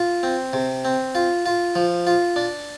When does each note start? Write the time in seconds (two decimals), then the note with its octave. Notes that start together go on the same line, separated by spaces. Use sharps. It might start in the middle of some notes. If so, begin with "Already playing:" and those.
Already playing: F4
0.23 C4
0.53 C3
0.85 C4
1.15 F4
1.46 F4
1.75 F3
2.07 F4
2.36 D4